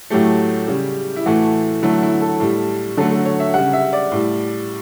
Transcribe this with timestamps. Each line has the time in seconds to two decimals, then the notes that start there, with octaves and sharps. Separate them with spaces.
0.10 A2 F#3 A3 G4
0.68 C#3 G3
1.16 E4
1.26 A2 E3 A3 F#4
1.82 D3 F#3 A3 E4
2.02 E4
2.21 A4
2.40 A2 G3
2.97 D3 F#3 A3 A4
3.11 A4
3.25 C#5
3.40 E5
3.54 C#3 G3 F#5
3.73 E5
3.93 D5
4.12 A2 G3